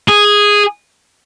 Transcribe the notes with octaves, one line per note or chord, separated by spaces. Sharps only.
G#4